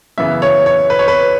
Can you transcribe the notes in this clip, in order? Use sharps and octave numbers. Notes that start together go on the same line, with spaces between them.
F#2 C#3 E3 B3 E5
C#5
C#5
B4
C#5
B4